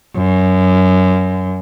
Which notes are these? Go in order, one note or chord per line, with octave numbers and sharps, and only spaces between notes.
F#2